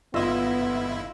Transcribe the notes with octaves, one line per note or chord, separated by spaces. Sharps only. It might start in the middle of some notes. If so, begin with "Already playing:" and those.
G1 B3 E4 F4 D#5 E5